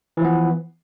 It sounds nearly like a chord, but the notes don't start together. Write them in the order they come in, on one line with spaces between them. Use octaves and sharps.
E3 F3 B3